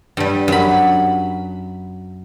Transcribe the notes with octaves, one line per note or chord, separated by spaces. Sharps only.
G2 G3
F#2 B5